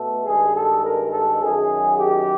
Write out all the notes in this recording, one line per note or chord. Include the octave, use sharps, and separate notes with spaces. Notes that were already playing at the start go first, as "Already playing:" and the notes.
Already playing: B2 A3 A4
G2 D#3 G#3 G#4
A4
A#4
A4
F#2 D#3 F#3 G#4
G4